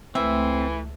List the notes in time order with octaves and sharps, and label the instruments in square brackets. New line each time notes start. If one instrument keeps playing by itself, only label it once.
[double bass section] C#2 A3 [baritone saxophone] E3 [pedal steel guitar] C4 C5 [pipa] E5